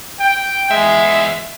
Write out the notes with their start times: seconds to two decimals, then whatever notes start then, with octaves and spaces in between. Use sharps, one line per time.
0.20 G5
0.71 E2 G#3 E5